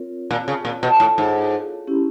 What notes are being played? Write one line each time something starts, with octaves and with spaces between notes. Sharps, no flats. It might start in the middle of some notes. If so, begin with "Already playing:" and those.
Already playing: C4 F4 A#4 C#5
A#2
C#3
A#2
B2 F4 A4 C#5 F5
A2
G#2
C#4 E4 G4